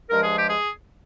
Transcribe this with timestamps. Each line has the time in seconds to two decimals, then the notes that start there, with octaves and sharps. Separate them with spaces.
0.09 G2 F3 G#3 A#4
0.22 G#4
0.35 G4
0.48 G#4